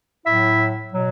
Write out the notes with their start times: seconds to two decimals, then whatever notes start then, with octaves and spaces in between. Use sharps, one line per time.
0.26 A2 F#3 E4 E5
0.94 B2 F#3